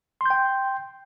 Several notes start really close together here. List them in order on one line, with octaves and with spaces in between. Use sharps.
C6 G6 G5